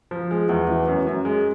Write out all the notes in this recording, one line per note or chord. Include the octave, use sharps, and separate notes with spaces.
F3
G#3
E2
E3
F#2
F#2
G#3